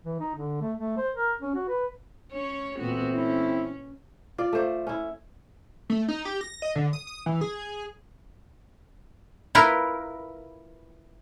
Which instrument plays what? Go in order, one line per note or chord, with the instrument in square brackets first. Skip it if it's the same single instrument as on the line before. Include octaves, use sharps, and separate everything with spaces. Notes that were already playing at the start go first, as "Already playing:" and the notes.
[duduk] E3
D#4
D3
A3
A3
C5
A#4
C#4
F#4
B4
[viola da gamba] C#4 C#5
[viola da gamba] A#2 B3 F#4 [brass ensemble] E3 A3 C4
[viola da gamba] C#4 [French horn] E4
[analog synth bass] F4 [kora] D5
[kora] A3 C5 D5
C#4 E4
[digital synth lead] A3
D#4
G4
A#6
D#5
D3
D#6
D#6
E3
G#4
[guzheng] E4 F4 A#4 B4